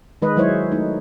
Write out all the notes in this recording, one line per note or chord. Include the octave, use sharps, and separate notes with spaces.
D#3 G#3 B4 D#5
F#3 G#3 E4 C5 C#5
A3 D#4